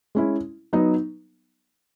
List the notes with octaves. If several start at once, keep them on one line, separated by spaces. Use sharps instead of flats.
G#3 C#4 E4
F#3 B3 D#4